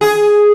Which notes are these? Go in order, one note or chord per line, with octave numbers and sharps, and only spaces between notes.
G#4